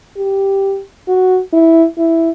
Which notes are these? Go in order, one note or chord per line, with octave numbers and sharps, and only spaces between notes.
G4
F#4
E4
E4